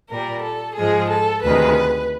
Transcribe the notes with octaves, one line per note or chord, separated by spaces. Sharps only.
A#2 G3 A#4
A4
G#2 F3 G#3 G#4
A4
D2 C3 D#3 G#3 B4